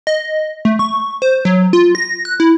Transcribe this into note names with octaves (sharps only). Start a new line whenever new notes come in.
D#5
A3
C#6
C5
F#3
F4
A#6
F#6
E4